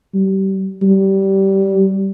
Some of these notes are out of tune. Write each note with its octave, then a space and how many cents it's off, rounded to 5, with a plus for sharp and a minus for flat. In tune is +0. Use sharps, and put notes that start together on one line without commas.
G3 -30
G3 -20